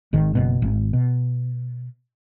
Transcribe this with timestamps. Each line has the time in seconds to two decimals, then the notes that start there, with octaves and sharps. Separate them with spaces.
0.13 G#1 G#2 D#3
0.35 F#1 B2
0.62 G#1
0.93 B2